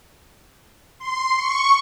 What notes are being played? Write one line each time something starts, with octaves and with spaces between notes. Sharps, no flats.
C6
C#6